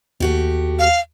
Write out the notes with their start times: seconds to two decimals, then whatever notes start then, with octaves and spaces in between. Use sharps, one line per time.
0.20 D#2 A3 F#4 G4
0.79 F5